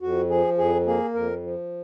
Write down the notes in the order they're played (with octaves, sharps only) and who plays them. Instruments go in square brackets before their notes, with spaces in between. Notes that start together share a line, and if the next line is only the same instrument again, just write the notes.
[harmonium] F2 F#4
F3 G#4
F2 G#4
A#3 G#4
F2 A#4
F3